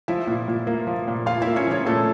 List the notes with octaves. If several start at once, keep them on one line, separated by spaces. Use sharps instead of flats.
F3 E4 E5
A#2
A#2
A#3
F3
A#2
A#2 F4 F5
E4 E5
A#3
C#4 C#5
F3 C#4 C#5
A#2 A3 A4